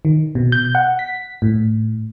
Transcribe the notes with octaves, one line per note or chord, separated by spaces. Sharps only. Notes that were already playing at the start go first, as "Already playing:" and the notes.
D#3
B2
G6
F#5
B6
A2